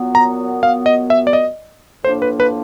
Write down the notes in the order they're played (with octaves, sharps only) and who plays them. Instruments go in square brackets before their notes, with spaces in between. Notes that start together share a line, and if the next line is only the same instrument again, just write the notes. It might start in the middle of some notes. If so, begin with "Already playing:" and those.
Already playing: [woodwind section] A#2 F#3 B3
[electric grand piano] A#5
F5
D#5
E5
D5
D#5
[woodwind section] A2 F3 A#3 D4 [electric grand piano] C5
[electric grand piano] B4
B4